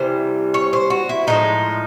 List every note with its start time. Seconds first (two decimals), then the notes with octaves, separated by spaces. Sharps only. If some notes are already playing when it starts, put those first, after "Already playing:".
Already playing: C3 E3 G3 C5
0.54 C#5
0.73 C5
0.90 F#4
1.09 E4
1.27 A2 F3 G#3 D#4